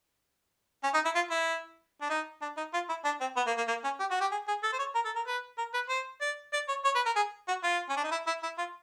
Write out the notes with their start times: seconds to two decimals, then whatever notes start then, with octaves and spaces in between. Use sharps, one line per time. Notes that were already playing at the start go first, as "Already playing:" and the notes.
0.84 C#4
0.94 D#4
1.05 E4
1.15 F4
1.31 E4
2.01 D4
2.10 D#4
2.42 D4
2.57 D#4
2.74 F4
2.89 E4
3.05 D4
3.21 C4
3.37 B3
3.47 A#3
3.57 A#3
3.68 A#3
3.84 C#4
4.00 G4
4.11 F#4
4.21 G4
4.32 G#4
4.48 G#4
4.63 A4
4.73 C5
4.79 C#5
4.95 A#4
5.05 A4
5.16 A#4
5.27 B4
5.58 A#4
5.74 B4
5.89 C5
6.21 D5
6.53 D5
6.68 C#5
6.85 C#5
6.95 B4
7.06 A#4
7.16 G#4
7.48 F#4
7.63 F4
7.89 C#4
7.97 D4
8.04 D#4
8.11 E4
8.27 E4
8.43 E4
8.58 F4